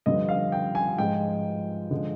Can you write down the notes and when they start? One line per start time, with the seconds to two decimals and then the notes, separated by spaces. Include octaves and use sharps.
0.06 G2 D3 F3 D#5
0.29 F5
0.52 G5
0.75 G#5
0.98 G#2 F3 G#3 G5
1.91 D3 F3 G#3